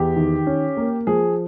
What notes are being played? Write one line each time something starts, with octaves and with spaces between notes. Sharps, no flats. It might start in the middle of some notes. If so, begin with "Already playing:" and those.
Already playing: E2 G4
D#3
C#4
A#3
F3 G#4